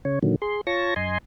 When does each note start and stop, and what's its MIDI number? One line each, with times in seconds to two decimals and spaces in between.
0.05 0.19 49
0.05 0.19 73
0.23 0.36 46
0.23 0.36 50
0.23 0.36 51
0.23 0.36 54
0.42 0.61 68
0.42 0.61 84
0.67 0.94 65
0.67 0.94 73
0.67 0.94 81
0.67 0.94 85
0.67 0.94 94
0.96 1.18 42
0.96 1.18 75
0.96 1.18 80
0.96 1.18 84